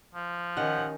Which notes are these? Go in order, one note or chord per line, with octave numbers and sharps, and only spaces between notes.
F3
D#3 C#4 G4 D#5 F#5